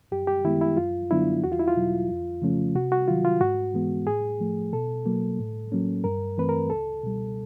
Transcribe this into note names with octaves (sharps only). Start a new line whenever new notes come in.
F#2 G4
G4
D#3 G#3 B3 E4
E4
F#2 F4
D3 F#3 B3 D4 E4
E2 F#4
F4
E4
F4
B2 F#3
F2
C#3 F3 A3 C#4
C3 F#4
F#4
D#3 F#3 F4
F4
G#2 F#4
E3 G#3 B3
A2 G#4
F3 A3
B2 A4
F#3 A#3
A2
F#3 A#3 C#4
G2 A#4
E3 A3 C4 B4
A#4
C#2 A4
B2 G3